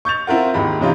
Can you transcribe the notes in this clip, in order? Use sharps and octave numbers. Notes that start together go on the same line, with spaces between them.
C#6 G6 A6 F7
C4 E4 F4 A#4 F#5
D#2 G#2 B5
G#2 C3 E3 C#4 D#4 F4